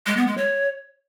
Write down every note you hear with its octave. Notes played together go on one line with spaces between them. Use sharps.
G#3
B3
G#3
C#5